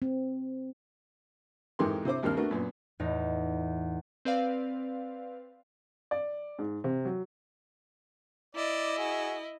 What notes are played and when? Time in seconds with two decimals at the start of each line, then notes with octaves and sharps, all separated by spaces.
0.02 C4
1.79 F2 G#2 E3 G4 A#4 C6
2.05 C3 E4 C5 D6
2.23 G#1 D#2 G3 C4 A#4 F6
2.37 A3 B3 D4 F#4 A#4
2.51 F#2 A#2 B3
3.00 E2 A2 D#4
4.25 C4 B4 D5 F5
6.11 D5
6.59 G#2
6.84 C3
7.05 F#3
8.55 E4 D5 D#5
8.98 F#4 G#4